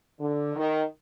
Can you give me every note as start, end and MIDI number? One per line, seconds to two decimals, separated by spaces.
0.20 0.54 50
0.56 0.82 51